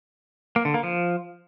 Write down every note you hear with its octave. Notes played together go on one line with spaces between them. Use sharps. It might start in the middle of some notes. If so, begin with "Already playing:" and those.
A#3
D3
A#3
F3